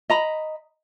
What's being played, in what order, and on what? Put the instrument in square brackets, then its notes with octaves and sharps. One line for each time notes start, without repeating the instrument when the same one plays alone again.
[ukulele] D#5 A#5 B5